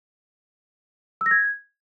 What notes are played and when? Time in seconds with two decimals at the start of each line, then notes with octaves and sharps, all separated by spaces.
1.21 E6
1.26 A#6
1.31 G#6